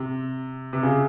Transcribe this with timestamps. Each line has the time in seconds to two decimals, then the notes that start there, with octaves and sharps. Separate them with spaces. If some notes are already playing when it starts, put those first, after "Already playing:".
Already playing: C3
0.73 C3
0.83 C#3